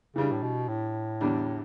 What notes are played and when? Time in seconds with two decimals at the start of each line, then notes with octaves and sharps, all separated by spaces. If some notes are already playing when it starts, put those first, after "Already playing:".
0.16 C#3 E3 G3 D4
0.32 A2
0.42 B2
0.68 A2
1.21 E2 D3 G3 D4